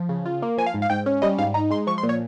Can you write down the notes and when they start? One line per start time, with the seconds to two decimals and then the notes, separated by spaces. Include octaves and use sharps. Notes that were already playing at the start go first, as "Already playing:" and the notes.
Already playing: F3
0.09 C#3
0.26 F4
0.42 A#3
0.58 F3 G#5
0.66 F5
0.74 G#2
0.82 F5
0.90 G#2 G5
1.06 C#4
1.22 G3 D#5
1.38 G#2 F5
1.54 D#4 A#5
1.70 G#3 C6
1.87 F3 C#6
1.98 C6
2.03 A#2
2.09 C#5